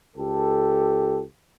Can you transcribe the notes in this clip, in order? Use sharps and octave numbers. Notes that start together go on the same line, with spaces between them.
C#2 G4 A4